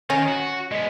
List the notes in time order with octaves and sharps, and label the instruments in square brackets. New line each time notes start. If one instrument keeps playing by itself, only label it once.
[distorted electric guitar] D#3 [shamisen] C#4 [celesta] A#6
[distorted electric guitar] F#4
[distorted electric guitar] G#3 B3 [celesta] D#5 B6